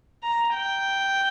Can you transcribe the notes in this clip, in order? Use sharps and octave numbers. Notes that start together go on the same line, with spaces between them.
A#5
G5